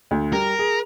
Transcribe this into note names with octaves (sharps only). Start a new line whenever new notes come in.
D2
G3 A#4
G#4